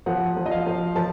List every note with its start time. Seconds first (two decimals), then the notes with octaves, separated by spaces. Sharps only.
0.06 F3 F#5
0.36 F3
0.46 D#5
0.51 F5
0.66 F3
0.96 F3 A5